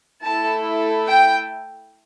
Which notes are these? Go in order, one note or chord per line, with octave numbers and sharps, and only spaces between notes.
A3 E4 A4 A5
G5